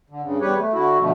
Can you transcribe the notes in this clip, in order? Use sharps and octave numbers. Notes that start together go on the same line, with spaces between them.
D3
G2 C#3
E2 G3 G4 B4 C#5
A3
D3 E4 F#4
B2 D3 F3 A3